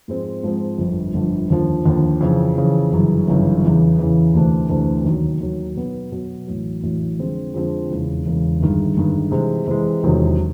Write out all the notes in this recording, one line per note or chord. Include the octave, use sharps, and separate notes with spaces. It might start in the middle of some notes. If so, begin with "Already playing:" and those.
G#2 F3 G#3 C4
G#2 F3 G#3 C4
G1 F2 D3
G1 F2 D3
D#2 D3 F3
D#2 D3 F3
F2 C#3 E3
F2 C#3 E3
G1 F#2 C#3 E3
G1 F#2 C#3 E3
E2 C#3 E3
E2 C#3 E3
D2 C3 E3 A3 D4
D2 C3 E3 A3 D4
D#2 D#3 F#3
D#2 D#3 F#3
B2 F#3 B3
B2 F#3 B3
A1 A2 F#3
A1 A2 F#3
F2 D3 F3 G#3 C4
F2 D3 F3 G#3 C4
E1 E2 C#3
E1 E2 C#3
G1 G2 D#3 G#3
G1 G2 D#3 G#3
C3 E3 G#3
C3 E3 G#3
E1 E2 C3 D#3 F#3